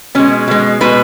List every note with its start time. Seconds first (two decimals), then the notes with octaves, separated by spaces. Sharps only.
0.15 B2 G#3 C#4
0.48 B2 G#3
0.81 B2 G#3 B4